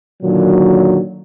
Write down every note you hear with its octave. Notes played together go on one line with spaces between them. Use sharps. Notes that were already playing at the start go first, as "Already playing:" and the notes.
A#2 D3 D#3 F#3